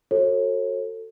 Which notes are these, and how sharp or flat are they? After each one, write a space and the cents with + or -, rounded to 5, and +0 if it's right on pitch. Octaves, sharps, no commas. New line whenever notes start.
F#4 +0 A4 +25 C#5 -40